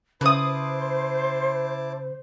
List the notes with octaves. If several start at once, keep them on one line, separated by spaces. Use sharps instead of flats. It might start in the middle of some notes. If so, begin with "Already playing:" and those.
C#3 E4 B4 C5 A5 D6 D#6